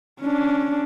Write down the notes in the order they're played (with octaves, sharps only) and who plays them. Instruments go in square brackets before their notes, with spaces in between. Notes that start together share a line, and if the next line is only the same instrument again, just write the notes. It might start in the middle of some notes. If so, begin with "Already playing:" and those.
[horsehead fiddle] C#4 D4